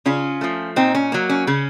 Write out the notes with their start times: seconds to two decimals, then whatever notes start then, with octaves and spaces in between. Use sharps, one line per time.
0.05 C#3 C#4 F4
0.41 F3 A3
0.76 A#2 C4 D#4
0.95 C#4
1.12 F#3 A#3
1.29 C#4
1.47 C#3 C#4